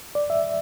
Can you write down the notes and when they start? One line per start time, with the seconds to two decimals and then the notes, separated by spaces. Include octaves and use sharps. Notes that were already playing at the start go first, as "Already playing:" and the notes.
0.15 D5
0.30 E5